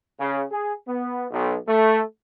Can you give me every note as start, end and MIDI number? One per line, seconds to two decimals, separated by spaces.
0.20 0.43 49
0.51 0.73 68
0.88 1.26 59
1.31 1.56 35
1.68 2.03 57